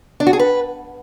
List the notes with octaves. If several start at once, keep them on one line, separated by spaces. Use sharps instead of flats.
D4
F#4
G#4
B4